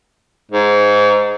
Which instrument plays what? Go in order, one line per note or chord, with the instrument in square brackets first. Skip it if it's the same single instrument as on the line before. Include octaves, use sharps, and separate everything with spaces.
[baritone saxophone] G#2